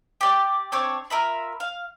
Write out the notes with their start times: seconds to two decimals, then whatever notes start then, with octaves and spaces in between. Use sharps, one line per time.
0.21 G4 D5
0.72 C4 D4 C#5
1.10 F4 A#4 E5 B5
1.60 F5